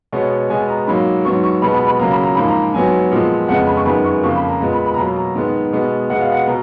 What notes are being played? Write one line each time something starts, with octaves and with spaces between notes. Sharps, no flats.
B2 G#3 B3 C#5
B2 G#3 B3 G#5
A#5
G#2 F#3 A#3 B5
G#2 F#3 B3 C#6
C#6
B2 G#3 B3 B5
B5
B5
C#3 F#3 A#3 A#5
B5
A#5
G#2 F3 A#3 B5
A#5
G#2 F#3 B3 G#5
A#2 F3 G#3 B3
F2 C#3 G#3 B3 F#5
B5
C#6
F#2 D#3 G#3 B3 B5
C#6
F2 C#3 F3 A#3 C#6
B5
A#5
A#2 G#3 B3
B5
B5
A#5
B2 F#3 A#3 B5
A#5
G#2 D#3 G#3 B3
B2 G#3 B3
B2 G#3 B3 F#5
F5
F#5
B2 A#5